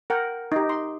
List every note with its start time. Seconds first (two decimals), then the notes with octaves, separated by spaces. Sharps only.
0.10 A#4 F#5 G5
0.52 D#4 G4
0.69 C6